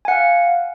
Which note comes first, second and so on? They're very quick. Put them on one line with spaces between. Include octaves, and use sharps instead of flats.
G#5 F#5 F5